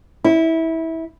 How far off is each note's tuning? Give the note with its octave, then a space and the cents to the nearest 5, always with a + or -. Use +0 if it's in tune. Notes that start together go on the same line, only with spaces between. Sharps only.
E4 -20